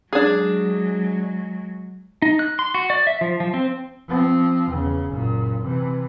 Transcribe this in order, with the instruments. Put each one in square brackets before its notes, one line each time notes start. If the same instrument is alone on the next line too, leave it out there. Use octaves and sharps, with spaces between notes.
[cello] F#3 G#3 [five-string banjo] D4 G#4
[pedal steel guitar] D#4
F#6
C6
F#4
D5
E5
F3
F3
C4
[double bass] F3 C4
E2 C#3
F#1 A#2
C3 E3